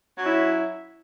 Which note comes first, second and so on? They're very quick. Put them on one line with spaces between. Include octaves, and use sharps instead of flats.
F#3 C#4 E4